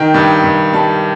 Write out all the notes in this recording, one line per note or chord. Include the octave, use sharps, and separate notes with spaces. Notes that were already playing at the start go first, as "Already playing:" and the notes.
Already playing: D#3 G5
G2
G2
G3 A5